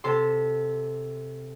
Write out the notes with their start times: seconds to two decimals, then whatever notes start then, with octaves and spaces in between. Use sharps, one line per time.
0.04 C3 A4 C6